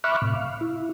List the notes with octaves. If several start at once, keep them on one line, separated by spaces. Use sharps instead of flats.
E5 B5 C#6 D6 F6 F#6
A2 C3
F5
E4